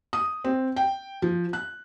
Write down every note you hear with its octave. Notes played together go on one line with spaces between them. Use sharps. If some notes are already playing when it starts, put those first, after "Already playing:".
D#6
C4
G5
F3
F#6